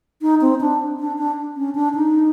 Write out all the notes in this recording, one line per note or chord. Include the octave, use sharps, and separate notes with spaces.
D#4
C4
D4
D4
D4
C#4
D4
D#4